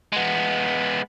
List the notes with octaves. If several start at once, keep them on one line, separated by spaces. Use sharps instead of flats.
G#3 B3